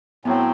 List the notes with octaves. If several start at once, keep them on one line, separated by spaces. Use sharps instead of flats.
A2 F#3 B3 C4